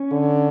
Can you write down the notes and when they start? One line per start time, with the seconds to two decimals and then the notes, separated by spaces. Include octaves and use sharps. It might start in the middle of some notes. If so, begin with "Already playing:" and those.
Already playing: C#4
0.11 D3